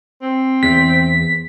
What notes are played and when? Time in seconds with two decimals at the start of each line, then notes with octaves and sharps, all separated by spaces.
0.22 C4
0.63 E2 B6